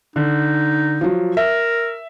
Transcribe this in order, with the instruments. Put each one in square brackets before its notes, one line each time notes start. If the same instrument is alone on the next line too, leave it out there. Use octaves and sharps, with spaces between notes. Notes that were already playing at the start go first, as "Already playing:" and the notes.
[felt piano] D3 [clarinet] D#4
[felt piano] F3 F#3
[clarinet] A#4 [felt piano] E5